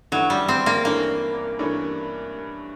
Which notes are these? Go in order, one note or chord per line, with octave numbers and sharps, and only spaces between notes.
G2 E3 F#3 A3 C#4
G3
C4
A#3
G2 E3 A3 A#3 C#4
G2 E3 A3 C#4